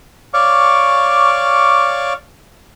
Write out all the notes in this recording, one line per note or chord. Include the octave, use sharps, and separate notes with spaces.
C#5 D5 F5 C#6 D6